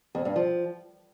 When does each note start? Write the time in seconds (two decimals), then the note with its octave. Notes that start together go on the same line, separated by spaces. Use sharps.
0.15 F2
0.25 G2
0.36 F3